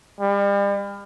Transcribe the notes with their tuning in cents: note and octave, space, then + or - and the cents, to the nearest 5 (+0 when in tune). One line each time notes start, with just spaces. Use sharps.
G3 +40